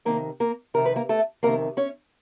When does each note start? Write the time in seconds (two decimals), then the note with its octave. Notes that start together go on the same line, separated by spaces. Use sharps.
0.05 F2 C3 D#3 A#3 A#4
0.40 A#3 A#4
0.74 F2 C3 D#3 A#4
0.86 B4
0.96 A#3 A#4
1.09 A3 A4
1.43 F2 C3 D#3 A#3 A#4
1.77 C#4 C#5